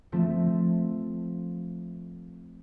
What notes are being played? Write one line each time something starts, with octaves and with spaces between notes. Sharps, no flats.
F3 A3 C4